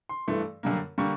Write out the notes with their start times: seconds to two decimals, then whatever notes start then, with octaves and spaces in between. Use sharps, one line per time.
0.09 C6
0.27 G2 E3 A3
0.63 F#2 D3 G3 A#3
0.98 D3 G3 A#3 C#6